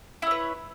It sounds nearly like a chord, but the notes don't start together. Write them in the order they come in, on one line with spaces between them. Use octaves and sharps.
E4 C#5 B4